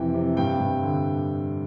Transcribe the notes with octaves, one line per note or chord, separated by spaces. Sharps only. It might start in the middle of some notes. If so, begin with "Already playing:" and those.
Already playing: F2 C3 E3 G5
C3
G2 G5
G2
D3